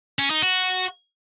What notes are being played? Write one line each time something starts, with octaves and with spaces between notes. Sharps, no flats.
C#4
D#4
F#4